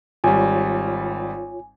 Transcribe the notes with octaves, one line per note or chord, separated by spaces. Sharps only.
G#1 G3 F4 C#5 G#5